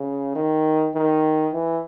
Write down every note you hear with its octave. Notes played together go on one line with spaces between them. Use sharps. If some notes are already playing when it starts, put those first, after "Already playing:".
Already playing: C#3
D#3
D#3
E3